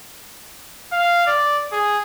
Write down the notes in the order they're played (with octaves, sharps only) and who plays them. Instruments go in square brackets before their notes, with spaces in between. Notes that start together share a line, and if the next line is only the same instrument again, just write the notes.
[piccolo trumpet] F5
D5
G#4